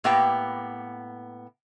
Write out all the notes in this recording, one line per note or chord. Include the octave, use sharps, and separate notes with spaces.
A2 A#3 B3 G4 G5